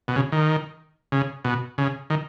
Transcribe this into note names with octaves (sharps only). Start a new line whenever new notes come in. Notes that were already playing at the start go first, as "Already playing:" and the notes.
B2
C#3
D#3
C#3
B2
C#3
D#3